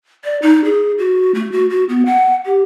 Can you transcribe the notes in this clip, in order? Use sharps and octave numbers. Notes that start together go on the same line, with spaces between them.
D5
D#4
G#4
F#4
A3
F#4
F#4
B3
F#5
G4